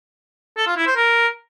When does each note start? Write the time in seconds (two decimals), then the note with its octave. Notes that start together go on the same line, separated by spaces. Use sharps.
0.57 A4
0.67 F4
0.77 E4
0.87 C5
0.96 A#4